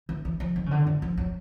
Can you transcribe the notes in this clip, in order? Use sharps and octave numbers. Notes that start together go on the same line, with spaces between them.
E3
E3
F3
D#3
C#3
D3
E3
F3
F#3